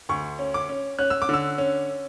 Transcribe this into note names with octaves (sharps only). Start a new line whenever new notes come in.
D2 C#6
C#4
D6
C#4
C#4 F#6
E6
D6
D3 E6
C#4